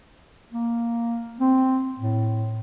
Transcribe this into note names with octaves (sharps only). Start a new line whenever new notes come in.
A#3
C4
A2